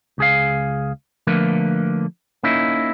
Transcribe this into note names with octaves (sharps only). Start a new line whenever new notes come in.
C#2 G#4 F5
D3 F3 A3 A#3 A#4 B4
A#3 C#4 D#4 E4